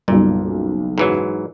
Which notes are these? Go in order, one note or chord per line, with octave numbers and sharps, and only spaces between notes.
F#1 B1 A#2 G3
G#2 E3 F#3